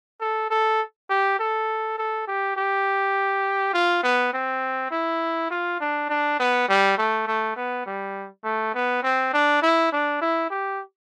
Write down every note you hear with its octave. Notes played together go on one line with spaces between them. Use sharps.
A4
A4
G4
A4
A4
G4
G4
F4
B3
C4
E4
F4
D4
D4
B3
G3
A3
A3
B3
G3
A3
B3
C4
D4
E4
D4
E4
G4